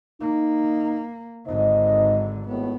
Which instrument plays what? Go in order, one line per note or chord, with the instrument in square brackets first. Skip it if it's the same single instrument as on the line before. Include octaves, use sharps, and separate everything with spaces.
[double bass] A#3 [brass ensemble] D#4
[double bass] G#1 D3 [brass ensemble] D#4 C5 D#5
[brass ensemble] G#1 A2 [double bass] B3